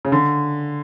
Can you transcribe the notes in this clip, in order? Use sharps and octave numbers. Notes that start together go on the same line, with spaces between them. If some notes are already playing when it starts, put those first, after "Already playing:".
C#3
D3